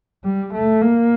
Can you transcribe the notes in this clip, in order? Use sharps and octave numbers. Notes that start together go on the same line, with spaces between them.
G3
A3
A#3